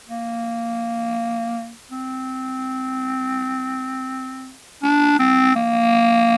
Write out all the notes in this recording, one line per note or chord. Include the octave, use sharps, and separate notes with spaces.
A#3
C4
D4
C4
A#3